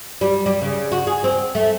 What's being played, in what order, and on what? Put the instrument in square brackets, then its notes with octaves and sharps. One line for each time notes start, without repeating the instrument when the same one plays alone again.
[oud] G3
G3
C#3
F#4
G#4
C4
A3